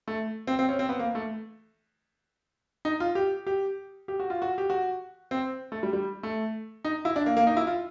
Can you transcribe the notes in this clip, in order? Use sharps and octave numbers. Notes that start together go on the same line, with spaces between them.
A3
C4
C4
C#4
C4
B3
A#3
A3
D#4
F4
G4
G4
G4
F#4
F4
F#4
G4
F#4
C4
A3
G3
G3
A3
D#4
E4
D4
A#3
A#3
D#4
E4
F4